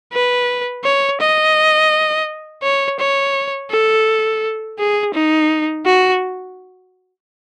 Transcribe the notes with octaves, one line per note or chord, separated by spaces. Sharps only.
B4
C#5
D#5
C#5
C#5
A4
G#4
D#4
F#4